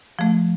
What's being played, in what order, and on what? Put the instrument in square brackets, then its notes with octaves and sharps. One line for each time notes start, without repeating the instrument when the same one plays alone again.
[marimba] F3 A3